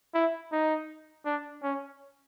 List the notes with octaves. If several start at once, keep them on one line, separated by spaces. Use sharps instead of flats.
E4
D#4
D4
C#4